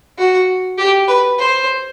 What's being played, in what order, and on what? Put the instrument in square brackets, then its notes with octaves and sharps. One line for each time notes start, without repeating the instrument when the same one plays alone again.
[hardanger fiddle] F#4
G4
B4
C5